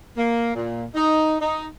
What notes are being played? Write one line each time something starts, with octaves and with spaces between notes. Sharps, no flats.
A#3
A#2
D#4
D#4